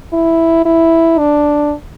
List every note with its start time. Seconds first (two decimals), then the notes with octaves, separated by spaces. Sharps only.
0.13 E4
0.65 E4
1.18 D4